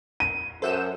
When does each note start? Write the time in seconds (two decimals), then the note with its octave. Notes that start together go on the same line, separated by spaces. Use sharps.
0.20 D#7
0.62 F#2 A4 C5 E5 F#5 G6 E7